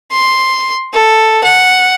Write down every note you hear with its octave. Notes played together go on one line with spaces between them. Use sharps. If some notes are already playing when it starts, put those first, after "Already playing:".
C6
A4
F#5